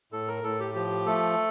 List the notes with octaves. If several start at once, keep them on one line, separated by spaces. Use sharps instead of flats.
A2 A4
A#4
A2 A4
G4
F3 G4
A3 A4